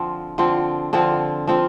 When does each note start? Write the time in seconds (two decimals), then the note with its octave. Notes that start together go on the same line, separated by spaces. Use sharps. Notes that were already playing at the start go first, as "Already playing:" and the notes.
Already playing: D3 F3 C4 F4
0.38 D3 F3 C4 F4
0.93 D3 F3 C4 F4
1.47 F3 C4 F4